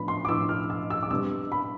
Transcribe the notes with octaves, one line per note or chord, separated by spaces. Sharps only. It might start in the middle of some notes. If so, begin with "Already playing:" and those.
Already playing: A2 F3 B3 D4 B5
C6
D6
A2 F3 B3 D4 E6
F6
E6
E6
D6
C3 G3 B3 D4 E6
B5